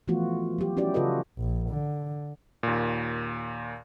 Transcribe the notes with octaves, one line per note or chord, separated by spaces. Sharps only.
E3 F3 A3 B3 F4 F#4
F#3 G4
C#4 E4 F#4 G4 D5
C#3 F4 F#4 A4 B4 D#5
A#1
D3
D#2 A#2